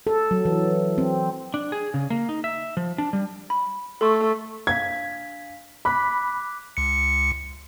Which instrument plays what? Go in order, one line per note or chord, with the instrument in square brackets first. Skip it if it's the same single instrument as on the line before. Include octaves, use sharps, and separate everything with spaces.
[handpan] A4
F#3
E3
C4
[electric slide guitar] D4
G#4
C#3
A#3
D#4
E5
F3
D4
G3
[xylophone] B5
[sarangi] A3 [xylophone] A4 C6 C#6
[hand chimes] D4 F5 B6 [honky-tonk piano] G#6
[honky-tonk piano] B5 [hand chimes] D6 F#6 B6
[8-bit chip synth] C#2 C#7